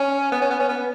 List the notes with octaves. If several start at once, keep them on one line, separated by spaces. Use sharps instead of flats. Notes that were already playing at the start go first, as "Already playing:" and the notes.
Already playing: C#4
B3
C#4
B3
C#4
B3